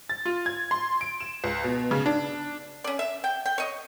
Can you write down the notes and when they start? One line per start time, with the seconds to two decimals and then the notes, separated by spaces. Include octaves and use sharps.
0.10 A6
0.26 F4
0.46 G#6
0.71 C6
1.01 D7
1.20 E7
1.44 C#2
1.64 B2
1.91 C#3
2.06 D4
2.84 C#4 D5
2.99 E5
3.24 G5
3.46 G5
3.58 C#5 D#5